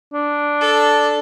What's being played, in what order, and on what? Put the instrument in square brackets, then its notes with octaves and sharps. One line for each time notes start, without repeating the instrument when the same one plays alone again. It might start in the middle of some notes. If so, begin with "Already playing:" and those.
[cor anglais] D4
[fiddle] A4